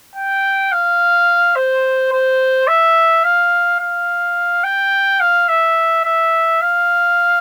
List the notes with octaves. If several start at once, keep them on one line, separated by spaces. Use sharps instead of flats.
G5
F5
C5
C5
E5
F5
F5
G5
F5
E5
E5
F5